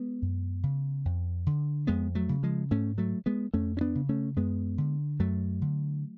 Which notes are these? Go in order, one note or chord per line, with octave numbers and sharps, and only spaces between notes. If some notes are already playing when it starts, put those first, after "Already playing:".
Already playing: G#3 B3
F#2
C#3
F2
D3
F2 G#3 B3
F#3 A3
C#3
F3 G#3
G#2 A3 C#4
F#3 A3
G#3 B3
F2 A3 C#4
C#4
B3 D4
C#3
A3 C#4
F#2 G#3 B3
D3
F#2 F#3 A3
D3